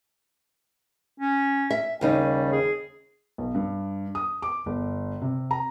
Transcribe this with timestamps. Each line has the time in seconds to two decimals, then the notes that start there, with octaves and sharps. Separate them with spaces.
1.20 C#4
1.71 E5
2.01 D#2 C#3 G3 D#4
2.52 G#4
3.38 B1
3.55 G2
4.15 D#6
4.42 D6
4.66 G1
5.22 C3
5.51 A#5